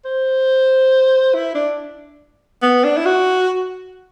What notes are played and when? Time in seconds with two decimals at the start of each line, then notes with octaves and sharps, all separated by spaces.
0.05 C5
1.34 E4
1.55 D4
2.62 B3
2.84 D4
2.97 E4
3.06 F#4